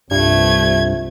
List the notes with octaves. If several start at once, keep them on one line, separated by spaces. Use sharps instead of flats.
C2 G2 A3 F4 E5 G#6